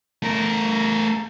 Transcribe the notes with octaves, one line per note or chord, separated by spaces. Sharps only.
A3 A#4